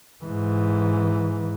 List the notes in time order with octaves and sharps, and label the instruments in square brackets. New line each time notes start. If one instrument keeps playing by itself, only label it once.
[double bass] G#2 E3